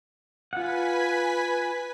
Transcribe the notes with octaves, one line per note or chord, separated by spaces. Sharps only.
F4 B4 F#5 G#5 B6